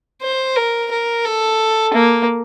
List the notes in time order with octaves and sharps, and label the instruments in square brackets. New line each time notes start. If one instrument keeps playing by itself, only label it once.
[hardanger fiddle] C5
A#4
A#4
A4
A#3